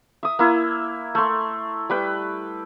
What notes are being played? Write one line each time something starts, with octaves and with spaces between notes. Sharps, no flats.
E5 D#6
A#3 E4
A3 C6
G3 B4 G5